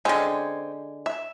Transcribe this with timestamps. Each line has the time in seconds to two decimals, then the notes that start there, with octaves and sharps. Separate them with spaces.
0.05 D3 G#3 C4 C#4
1.06 E5